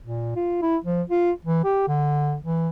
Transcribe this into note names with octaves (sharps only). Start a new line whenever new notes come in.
A#2
F4
E4
F3
F4
E3
G4
D3
E3